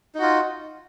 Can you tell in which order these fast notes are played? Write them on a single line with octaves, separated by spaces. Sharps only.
D#4 F#4 F4